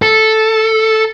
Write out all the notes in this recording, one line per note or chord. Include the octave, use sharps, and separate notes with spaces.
A4